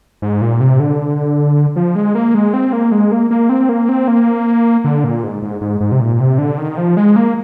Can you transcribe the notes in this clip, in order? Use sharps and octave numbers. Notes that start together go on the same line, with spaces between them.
G#2
A#2
C3
D3
F3
G#3
A#3
G#3
C4
A#3
G#3
A#3
A#3
C4
A#3
C4
A#3
D3
A#2
G#2
G#2
G#2
G#2
C3
A#2
C3
D3
D#3
F3
G#3
A#3